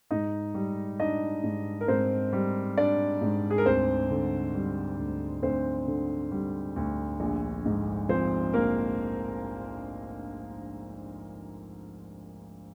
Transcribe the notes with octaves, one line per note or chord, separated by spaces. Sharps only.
G#2 D#4 D#5
G3
D4 D#4 D#5
G#2
A#4
G#2 C4 C5
G3
D4 D5
G#2
G#4
A#4
D2 C4 C5
D3
G3
D2
D2 C4 C5
D3
G3
D2
A#1
G#2
F3 C4 C5
A#1 A#3 A#4